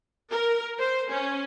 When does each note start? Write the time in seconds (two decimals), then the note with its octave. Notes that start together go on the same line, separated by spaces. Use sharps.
0.31 A#4
0.79 C5
1.11 C#4